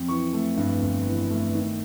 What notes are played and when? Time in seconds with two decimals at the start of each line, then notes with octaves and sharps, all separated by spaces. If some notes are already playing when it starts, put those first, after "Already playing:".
Already playing: F2
0.08 E3 C#6
0.33 A3
0.57 G2
0.81 G1
1.06 E3
1.30 A3
1.55 D#3